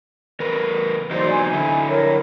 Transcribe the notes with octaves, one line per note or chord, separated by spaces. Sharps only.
E2 A#4 B4
E2 F#3 D#4 C5 D5
G#5
D3 E4
A#4 C#5